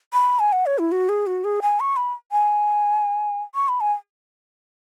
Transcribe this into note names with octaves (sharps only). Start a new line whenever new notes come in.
B5
G#5
F#5
C#5
E4
F#4
G#4
F#4
G#4
G#5
C#6
B5
G#5
C#6
B5
G#5